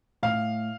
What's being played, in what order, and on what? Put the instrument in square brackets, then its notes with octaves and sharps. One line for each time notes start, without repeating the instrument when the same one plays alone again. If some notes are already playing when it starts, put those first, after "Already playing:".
[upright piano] A2 F5